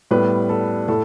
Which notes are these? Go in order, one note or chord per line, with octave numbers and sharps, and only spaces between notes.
A2 G3 B3 B4
A4
A2 A4